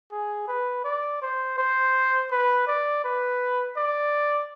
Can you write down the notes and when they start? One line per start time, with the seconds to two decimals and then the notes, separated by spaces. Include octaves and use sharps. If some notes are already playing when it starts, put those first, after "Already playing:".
0.11 G#4
0.48 B4
0.84 D5
1.22 C5
1.58 C5
2.31 B4
2.67 D5
3.04 B4
3.77 D5